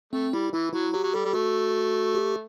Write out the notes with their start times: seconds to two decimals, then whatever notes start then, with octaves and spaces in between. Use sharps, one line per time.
0.13 A3 C4
0.33 G3 E4
0.53 E3 E4
0.73 F#3 E4
0.93 F#3 G4
1.04 F#3
1.14 G3 A4
1.25 G3
1.33 A3 F#4
2.15 G4